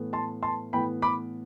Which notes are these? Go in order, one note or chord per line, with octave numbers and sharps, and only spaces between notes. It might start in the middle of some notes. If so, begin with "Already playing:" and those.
Already playing: A2 E3 B3
A5 C6
A5 C6
A2 E3 B3 G5 B5
B5 D6